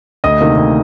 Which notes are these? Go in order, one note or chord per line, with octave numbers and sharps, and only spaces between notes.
D2 D#5 D#6
C3 D#3 A#3
D2